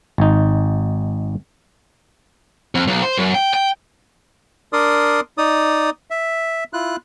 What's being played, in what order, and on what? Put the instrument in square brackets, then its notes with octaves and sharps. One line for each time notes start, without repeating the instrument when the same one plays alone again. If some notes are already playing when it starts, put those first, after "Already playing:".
[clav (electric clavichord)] G#1 D#4
[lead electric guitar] F2
B1
C5
F#2
G5
G5
[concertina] D4 A#4 D5 C6 D#6
D#4 D5 D#6
E5
E4 F4 F#6